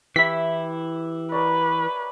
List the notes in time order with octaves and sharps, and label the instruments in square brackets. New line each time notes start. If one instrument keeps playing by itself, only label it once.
[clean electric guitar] E3 E4 [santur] G4 E5 [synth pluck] B6
[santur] A#4 C#5 D5 [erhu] B4